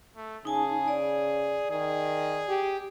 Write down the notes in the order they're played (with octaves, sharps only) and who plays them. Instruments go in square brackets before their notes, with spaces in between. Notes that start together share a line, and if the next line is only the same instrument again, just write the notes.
[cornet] A3
[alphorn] C#3 [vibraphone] D#4 G#5 A5 [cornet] G#4
[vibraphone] D5
[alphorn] D#3 [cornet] G#4
[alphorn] G4